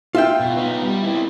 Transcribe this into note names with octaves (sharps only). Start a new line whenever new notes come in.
F4 E5 G5
B2
B3 D#4
G3
C4 E4